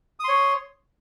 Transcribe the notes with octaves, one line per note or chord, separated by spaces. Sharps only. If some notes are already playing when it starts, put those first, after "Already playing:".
C#5 C6 D#6